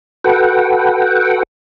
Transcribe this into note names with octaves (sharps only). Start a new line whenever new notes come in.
F#4 A4 B4 F#5 G5